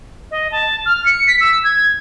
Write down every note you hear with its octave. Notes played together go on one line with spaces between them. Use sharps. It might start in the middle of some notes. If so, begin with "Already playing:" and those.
D#5
A5
F6
C#7
B6
E6
G#6